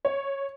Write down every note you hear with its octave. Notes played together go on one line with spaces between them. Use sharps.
C#5